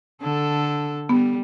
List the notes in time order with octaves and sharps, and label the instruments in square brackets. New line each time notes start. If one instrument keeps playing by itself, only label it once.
[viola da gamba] D3 A4
[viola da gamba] G3 [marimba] B3